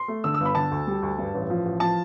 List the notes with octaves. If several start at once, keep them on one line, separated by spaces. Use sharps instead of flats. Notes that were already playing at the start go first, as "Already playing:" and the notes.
Already playing: C6
A3
D3 E6
E6
G1
B5
D3 A5
D2
G3
D2
G2
A1
F3
A1
F3 A5